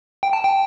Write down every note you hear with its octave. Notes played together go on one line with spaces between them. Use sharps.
G5
A5
G5